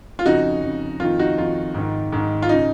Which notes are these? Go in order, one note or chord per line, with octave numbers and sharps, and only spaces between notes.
F4
F2 C#3 D#4 F#4
F2 C#3
F2 D#3 F4
D#4 F#4
F2 D#3 F4
G#2 D#3
G#2 D#3
F4
C#3 D#4